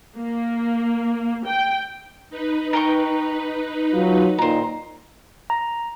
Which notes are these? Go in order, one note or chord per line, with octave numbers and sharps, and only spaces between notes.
A#3
G5
D#4 B4
A#4 G5 C#6
F#3 F4
A#2 D#3 C5 A#5
A#5